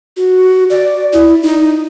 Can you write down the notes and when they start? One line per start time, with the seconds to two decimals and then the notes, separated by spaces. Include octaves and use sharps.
0.17 F#4
0.70 D5
1.13 E4
1.43 D#4